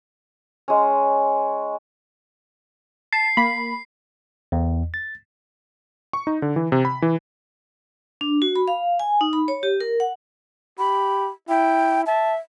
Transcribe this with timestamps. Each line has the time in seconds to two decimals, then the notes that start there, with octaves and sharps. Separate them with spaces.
0.68 G#3 C#4
3.13 A5 C7
3.37 A#3 B5
4.52 E2
4.94 A6
6.13 C#6
6.27 D#4
6.42 D3
6.56 E3
6.72 C3
6.85 B5
7.02 E3
8.21 D4
8.42 F#4
8.56 B5
8.68 F5
8.99 G#5
9.21 D#4
9.33 B5
9.48 C#5
9.63 G4
9.80 A#4
10.00 F#5
10.79 G4 B5
11.49 E4 G5
12.06 E5 A5